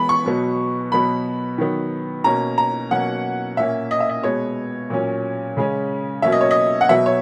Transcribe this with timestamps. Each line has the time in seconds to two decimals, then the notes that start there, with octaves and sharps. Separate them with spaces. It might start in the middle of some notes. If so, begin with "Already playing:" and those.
Already playing: E3 G#3 B3 B5
0.09 C#6
0.26 B2 F#3 B3
0.92 B2 F#3 B3 B5
1.58 D#3 F#3 B3
2.24 B2 A#3 C#4 A#5
2.58 A#5
2.91 B2 F#3 A#3 C#4 F#5
3.57 A#2 A#3 C#4 E5
3.91 D#5
4.00 E5
4.09 D#5
4.23 B2 G#3 B3 C#5
4.90 A#2 F#3 C#4
5.57 C#3 G#3 C#4
6.22 B2 F#3 A#3 C#4 E5
6.32 D#5
6.41 C#5
6.51 D#5
6.81 F#5
6.89 B2 F#3 B3 E5
7.06 C#5